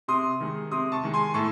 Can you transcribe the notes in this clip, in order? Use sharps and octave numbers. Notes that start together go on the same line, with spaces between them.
C3 C6 D#6
D#3 G#3
C3 C6 D#6
A5 C#6
D#3 G#3
G#5 C6
A2 A5 C#6